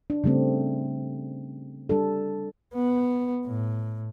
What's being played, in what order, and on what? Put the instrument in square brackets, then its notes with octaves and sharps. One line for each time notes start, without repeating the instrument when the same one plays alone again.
[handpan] D4
C#3 G3 A3 C4
G3 D4 A4
[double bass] B3
A2